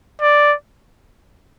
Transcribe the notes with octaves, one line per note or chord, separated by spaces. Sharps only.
D5